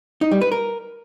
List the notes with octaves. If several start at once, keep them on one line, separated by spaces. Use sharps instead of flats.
D#4
G3
B4
A#4